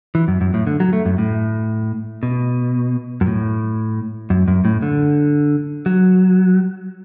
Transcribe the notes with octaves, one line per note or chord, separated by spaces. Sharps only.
E3
F#2
F#2
A2
D3
F#3
A3
F#2
A2
B2
F#2
A2
F#2
F#2
A2
D3
F#3